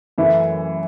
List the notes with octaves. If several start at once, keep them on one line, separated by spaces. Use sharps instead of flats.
F#2 E3 F#3 A3 E4